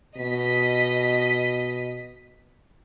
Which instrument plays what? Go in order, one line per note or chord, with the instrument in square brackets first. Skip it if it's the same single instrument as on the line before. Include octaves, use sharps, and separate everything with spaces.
[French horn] B2 [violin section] D#5 B6